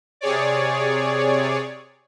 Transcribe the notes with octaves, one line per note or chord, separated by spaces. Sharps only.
C3 G#4 C#5 D5